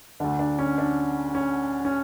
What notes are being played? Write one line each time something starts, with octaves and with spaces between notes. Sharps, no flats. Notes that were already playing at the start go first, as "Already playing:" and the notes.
D2 D3 D4
D4
C#4
D4
C#4
C#4